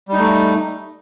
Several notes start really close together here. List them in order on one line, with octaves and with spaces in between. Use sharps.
G3 D#4 A3